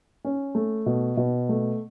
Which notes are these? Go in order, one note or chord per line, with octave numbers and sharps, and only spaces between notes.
C#4
A3
B2
B2
A3